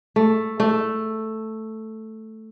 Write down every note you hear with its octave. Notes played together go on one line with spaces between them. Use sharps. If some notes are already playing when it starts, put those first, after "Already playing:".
A3
A3